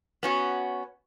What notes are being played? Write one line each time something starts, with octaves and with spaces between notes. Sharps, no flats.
B3 C#4 F#4